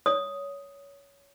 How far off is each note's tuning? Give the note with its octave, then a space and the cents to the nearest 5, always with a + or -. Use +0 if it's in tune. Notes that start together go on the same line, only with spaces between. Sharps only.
C#5 +15 D#6 +0